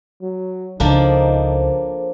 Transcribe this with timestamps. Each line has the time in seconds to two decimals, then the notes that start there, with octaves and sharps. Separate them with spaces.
0.22 F#3
0.80 C#2 F3 A#3 D4 D#4 A4 C5 C#5